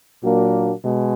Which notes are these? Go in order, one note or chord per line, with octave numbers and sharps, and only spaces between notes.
A#2 F#3 A#3 D4 F#4
B2 G#3